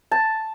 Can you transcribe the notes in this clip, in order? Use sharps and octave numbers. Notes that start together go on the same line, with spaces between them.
A5